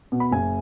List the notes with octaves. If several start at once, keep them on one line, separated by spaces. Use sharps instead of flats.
B2
B5
F#1 G#5